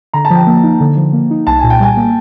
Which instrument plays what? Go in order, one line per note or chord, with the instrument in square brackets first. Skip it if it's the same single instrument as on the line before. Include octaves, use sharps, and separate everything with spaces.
[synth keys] D3 [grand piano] A#5
[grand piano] A5
[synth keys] F3
[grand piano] G5
[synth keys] A#3
D#4
D3
F3
A#3
D#4
[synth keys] C2 [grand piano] A5
[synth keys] A#2 [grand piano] G#5
[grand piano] G5
[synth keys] G3 [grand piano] G#5
[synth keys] A#3